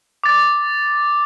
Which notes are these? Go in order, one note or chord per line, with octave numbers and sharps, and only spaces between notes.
D6 A6